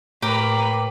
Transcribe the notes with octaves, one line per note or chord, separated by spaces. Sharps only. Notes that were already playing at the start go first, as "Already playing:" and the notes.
A2 A#3 G4 A#4 B4 G5 A#5